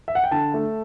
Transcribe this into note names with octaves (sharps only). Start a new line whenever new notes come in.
E5
F#5
G5
D3 A5
A3